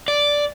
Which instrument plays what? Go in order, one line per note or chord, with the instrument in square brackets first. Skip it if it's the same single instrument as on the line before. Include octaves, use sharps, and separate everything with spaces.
[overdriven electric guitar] D5